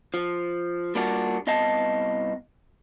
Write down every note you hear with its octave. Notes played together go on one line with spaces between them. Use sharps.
F3
G3 A#3 D4 F4 F#4
C2 B3 D#5 F5 A5